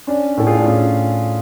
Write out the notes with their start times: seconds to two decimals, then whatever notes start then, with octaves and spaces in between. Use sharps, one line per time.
0.07 C#4 D4
0.37 A2 A4
0.47 F4 G#4
0.57 D4
0.66 A2 C#4 F4